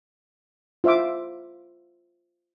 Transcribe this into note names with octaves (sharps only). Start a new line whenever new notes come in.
F4 C5 E5 F5 D6